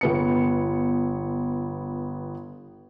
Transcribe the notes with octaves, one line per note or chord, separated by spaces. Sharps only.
G1 B3 C#7